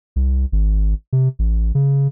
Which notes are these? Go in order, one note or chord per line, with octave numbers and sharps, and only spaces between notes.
C2
G#1
C3
A1
C#3